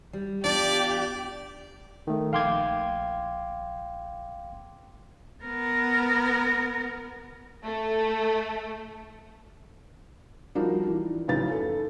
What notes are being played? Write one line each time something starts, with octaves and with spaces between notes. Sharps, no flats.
G3
E2 D4 F4 G4 D5
D#3 A3
A#1 F5 G5 C6 D6 G#6
B3 A#4
A3
F3 G3 D4 D#4 F#4 A#4
E3
F#2 A2 C#3 D#4 B4 A6
A4